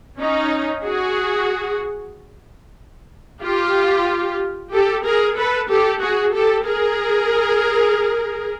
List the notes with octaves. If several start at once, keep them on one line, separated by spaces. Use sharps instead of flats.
C#4 D#4
F#4 G#4
F4 G4
G4 A4
G#4 A#4
A4 B4
G4 A4
F#4 G#4
G4 A4
G#4 A#4